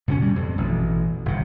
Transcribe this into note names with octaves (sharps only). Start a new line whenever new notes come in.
B2 D3 C4 C#4
G2 G3
F2
A1 B2
G1 C3